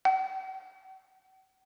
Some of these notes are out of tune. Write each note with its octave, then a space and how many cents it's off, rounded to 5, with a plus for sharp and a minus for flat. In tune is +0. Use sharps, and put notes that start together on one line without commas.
F#5 +45